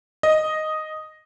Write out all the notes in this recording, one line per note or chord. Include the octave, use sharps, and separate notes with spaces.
D#5